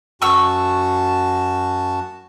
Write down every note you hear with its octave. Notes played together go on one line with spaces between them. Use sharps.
F#2 F#4 A5 C#6 E6